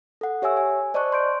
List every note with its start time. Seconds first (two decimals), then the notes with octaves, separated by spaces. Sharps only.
0.21 A4 F#5
0.42 G4 C#5 E5 G#5 E6
0.57 G#5
0.94 C5 D5 D#5 A5 C#6 F#6
1.12 C6 G6 D7